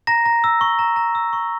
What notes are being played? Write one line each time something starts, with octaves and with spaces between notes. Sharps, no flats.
A#5 A#6
A#5
E6
C#6
A#5
A#5
E6
C#6